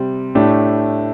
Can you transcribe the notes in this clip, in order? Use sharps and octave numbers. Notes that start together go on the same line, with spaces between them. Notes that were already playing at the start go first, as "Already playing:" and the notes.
Already playing: C3 G3 C4
A2 A3 D4 G4